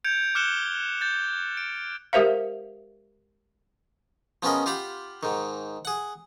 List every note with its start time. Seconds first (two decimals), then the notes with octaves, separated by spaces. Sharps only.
0.04 G6 G#6 C#7 D7 F7
0.35 D6 F6 F#6 C#7 E7 G7
1.01 G6 A6
1.57 D7
2.13 G#3 G4 A#4 C5 E5 F5
4.43 F3 B3 C#4 G#4 A#4 D#5
4.66 F4 G4 F5 F#5 B5
5.23 G#2 D#3
5.85 G#4 F#5